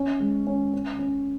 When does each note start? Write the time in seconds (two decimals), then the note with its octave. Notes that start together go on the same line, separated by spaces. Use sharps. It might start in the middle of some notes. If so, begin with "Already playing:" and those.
Already playing: C#4
0.20 G#3
0.47 C#4
0.74 C#4
0.99 C#4